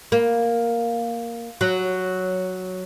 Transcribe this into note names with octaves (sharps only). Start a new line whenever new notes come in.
A#3
F#3